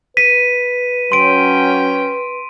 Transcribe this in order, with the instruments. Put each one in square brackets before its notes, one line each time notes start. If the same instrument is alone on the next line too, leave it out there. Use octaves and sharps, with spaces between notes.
[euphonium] B4 [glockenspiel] B6 [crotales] D#7
[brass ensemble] F#3 C#4 G5 [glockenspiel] C6 D7